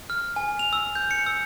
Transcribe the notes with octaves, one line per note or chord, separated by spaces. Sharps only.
F6
G#5
F7
E6
G6
C#7
E6